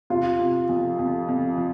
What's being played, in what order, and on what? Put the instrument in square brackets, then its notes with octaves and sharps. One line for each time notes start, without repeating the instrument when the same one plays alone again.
[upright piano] C3 [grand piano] F4
[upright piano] C3
F2
F2
F2
F3